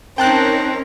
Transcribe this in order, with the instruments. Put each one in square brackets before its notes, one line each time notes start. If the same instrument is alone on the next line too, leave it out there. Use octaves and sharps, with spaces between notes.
[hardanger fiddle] C4 [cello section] C#4 D#4 A#4 [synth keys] G5 A5 F#6